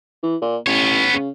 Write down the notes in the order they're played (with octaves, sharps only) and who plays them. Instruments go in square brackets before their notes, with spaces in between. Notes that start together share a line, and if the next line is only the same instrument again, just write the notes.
[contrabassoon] E3
A#2
[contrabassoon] A1 [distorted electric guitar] B3 C#5
[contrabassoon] C#3